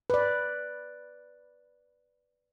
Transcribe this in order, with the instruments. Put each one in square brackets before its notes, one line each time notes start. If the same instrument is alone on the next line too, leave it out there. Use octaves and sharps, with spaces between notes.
[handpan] B4 D5